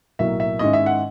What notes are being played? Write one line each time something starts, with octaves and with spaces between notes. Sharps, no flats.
B1 A2 F#3 A#3 E5
E5
G#2 D#3 G#3 C#4 E4 D#5
E5
F#5